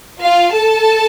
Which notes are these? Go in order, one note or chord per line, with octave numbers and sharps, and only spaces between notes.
F4 F5
A4 A5